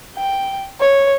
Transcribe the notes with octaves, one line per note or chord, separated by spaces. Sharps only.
G5
C#5